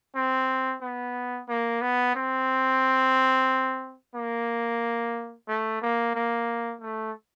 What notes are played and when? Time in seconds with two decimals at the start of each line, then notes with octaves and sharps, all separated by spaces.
0.15 C4
0.82 B3
1.49 A#3
1.81 B3
2.15 C4
4.15 A#3
5.48 A3
5.82 A#3
6.15 A#3
6.81 A3